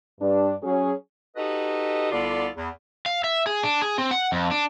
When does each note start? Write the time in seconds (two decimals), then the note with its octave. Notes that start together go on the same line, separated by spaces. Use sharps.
0.20 G2 D4
0.63 F#3 C#4 G#4
1.36 D#4 F#4 G4 A4 B4 D#5
2.11 C2 D3 B3 F4 A4 D5
2.56 E2
3.06 F5
3.24 E5
3.47 G#4
3.63 D4
3.82 G#4
3.98 C4
4.11 F#5
4.32 F2
4.51 D4